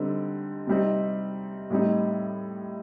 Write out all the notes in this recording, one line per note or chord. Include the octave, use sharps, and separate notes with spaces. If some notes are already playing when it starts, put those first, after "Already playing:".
Already playing: D3 G3 C4 D#4
C3 G3 C4 D#4
A2 G3 C4 D#4